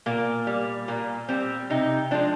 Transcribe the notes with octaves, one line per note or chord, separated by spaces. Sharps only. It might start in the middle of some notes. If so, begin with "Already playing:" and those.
A#2 A#3
G3
A#2 A#3
G3 C4
C3 D#4
F3 G#3 D4